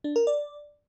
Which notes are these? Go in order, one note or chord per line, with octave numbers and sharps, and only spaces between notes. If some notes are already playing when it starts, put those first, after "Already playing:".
D4
A#4
D5